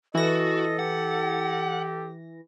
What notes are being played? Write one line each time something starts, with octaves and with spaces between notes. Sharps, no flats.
E3 F#4 A4 D#5 A#6
G4 F#5